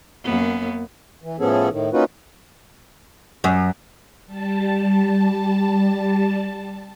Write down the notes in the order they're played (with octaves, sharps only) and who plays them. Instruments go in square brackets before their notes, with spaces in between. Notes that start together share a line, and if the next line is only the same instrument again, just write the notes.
[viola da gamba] F#2 A#3 B3
[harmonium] E3
A2 F3 B3 C#4 G#4 A4
A2 D#3
A#3 C#4 D#4 F4 F#4 B4
[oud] F#2
[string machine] G3 A5